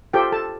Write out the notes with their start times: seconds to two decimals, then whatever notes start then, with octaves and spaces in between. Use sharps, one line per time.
0.13 F4 G4 A4 C5 G5
0.32 A4 A5